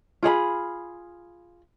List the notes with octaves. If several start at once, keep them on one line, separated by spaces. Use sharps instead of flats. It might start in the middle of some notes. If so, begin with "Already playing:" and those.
F4 G#4 F5 B5